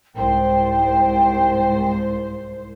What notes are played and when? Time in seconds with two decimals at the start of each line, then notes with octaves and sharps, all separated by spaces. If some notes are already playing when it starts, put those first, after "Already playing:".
0.15 C2 G#2 C5 G5